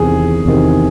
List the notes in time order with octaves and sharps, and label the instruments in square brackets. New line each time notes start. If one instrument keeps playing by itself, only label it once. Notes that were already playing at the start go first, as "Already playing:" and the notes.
Already playing: [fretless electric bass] E2 C3 D#3 [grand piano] G#4
[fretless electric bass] E2 C3 D#3